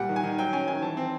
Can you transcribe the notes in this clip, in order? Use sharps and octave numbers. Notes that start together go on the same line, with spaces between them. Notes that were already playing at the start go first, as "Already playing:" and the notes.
Already playing: A#2 G3 F#5
D#3
G#5
D#3
F#3 G5
C#4 G#5
D#3 G#5
E3 A5
C4